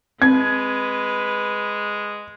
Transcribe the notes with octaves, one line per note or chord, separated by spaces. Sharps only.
G#3 C4 B4 G#6